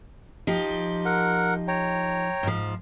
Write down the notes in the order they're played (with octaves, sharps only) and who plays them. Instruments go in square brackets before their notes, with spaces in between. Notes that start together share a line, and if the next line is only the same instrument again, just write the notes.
[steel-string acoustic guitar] F3 D#4 G4
[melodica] A#4 F#5
C#5 G5 A#5
[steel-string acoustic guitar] G#2 F3